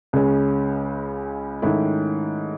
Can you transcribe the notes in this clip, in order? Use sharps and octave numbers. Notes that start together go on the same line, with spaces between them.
C#2 C#3 G#3 C#4
G#2 D#3 A3 C#4 E4